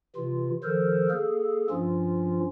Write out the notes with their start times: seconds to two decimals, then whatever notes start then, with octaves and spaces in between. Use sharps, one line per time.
0.16 C3 E3 F4
0.64 D#3 F3 A4 A#4 C5
1.10 A#3 G#4 A4
1.70 G2 F3 C#4 F4